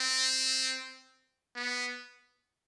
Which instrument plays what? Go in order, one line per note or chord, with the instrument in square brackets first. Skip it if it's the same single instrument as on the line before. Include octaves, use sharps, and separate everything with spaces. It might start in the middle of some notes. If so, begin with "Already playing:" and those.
Already playing: [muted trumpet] C4
B3